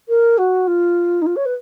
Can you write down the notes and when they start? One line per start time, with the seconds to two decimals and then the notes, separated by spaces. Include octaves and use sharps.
0.08 A#4
0.38 F#4
0.67 F4
1.21 D#4
1.26 F4
1.36 C#5
1.45 B4